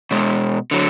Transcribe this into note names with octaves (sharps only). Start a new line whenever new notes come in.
B2 G#3
D3 F#3